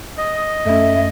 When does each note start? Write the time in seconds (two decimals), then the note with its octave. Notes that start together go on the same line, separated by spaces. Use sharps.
0.18 D#5 D#6
0.66 F#2 A3 C#4 E5